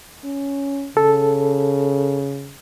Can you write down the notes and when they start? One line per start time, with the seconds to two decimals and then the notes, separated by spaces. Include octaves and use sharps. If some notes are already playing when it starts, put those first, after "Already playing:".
0.24 C#4
0.97 C#3 A4